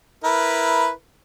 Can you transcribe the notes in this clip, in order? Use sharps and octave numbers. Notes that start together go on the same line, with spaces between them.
E4 A#4 B4